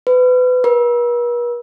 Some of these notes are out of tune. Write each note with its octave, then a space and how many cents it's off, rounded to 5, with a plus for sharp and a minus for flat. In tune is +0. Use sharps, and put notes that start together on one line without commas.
B4 +25
B4 -45